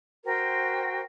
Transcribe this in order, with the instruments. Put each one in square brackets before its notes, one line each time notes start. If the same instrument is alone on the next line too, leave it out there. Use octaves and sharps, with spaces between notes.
[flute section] F#4 A#4 C5 G5